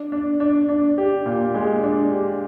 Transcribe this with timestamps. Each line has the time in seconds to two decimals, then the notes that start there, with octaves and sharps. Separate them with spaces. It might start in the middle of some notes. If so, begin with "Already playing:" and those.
Already playing: D4
0.12 D4
0.40 D4
0.69 D4
0.98 G4
1.26 A#2
1.54 G#3
1.83 D4
2.12 G4